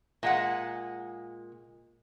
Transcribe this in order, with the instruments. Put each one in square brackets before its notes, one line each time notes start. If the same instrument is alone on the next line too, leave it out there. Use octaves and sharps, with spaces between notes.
[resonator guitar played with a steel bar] A#2 G#3 F#5